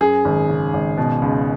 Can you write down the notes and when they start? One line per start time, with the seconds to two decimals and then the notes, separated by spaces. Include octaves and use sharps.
0.01 F#2 G#4
0.25 G#1
0.49 C#3
0.73 G#1
0.97 B2
1.22 C#2